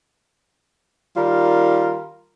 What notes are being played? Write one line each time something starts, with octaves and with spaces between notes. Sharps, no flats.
D#3 G3 F4 A#4